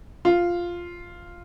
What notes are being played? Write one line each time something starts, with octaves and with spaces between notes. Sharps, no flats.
F4